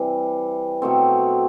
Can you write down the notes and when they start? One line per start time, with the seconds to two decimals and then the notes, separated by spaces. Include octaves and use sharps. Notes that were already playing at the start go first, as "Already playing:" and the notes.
Already playing: C3 E3 G3
0.82 B2 F#3 A3 C4